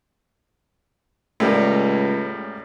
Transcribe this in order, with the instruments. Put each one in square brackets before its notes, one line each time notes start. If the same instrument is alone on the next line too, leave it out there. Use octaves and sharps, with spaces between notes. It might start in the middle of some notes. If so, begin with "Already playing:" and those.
[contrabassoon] C#2 [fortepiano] A2 G3 A#3